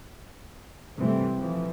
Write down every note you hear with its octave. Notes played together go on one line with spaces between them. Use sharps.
C3 E3 G3 A3 C4
E3 F3